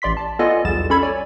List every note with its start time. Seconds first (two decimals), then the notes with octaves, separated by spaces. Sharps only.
0.02 A1 D5 C6 B6
0.17 A5
0.39 B3 F4 A4 D5 D#5 G#5
0.65 B1 E2 G3 B3 A6 E7
0.90 C#4 A4 B5 G#6
1.03 C#5 D5 G#5